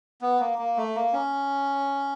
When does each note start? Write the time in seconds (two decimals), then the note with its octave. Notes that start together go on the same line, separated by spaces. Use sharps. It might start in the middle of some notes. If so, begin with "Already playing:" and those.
0.22 B3
0.40 A#3
0.58 A#3
0.77 A3
0.96 A#3
1.13 C#4